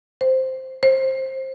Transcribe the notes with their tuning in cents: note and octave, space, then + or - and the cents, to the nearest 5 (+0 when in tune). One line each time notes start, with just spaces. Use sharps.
C5 +0
C5 +20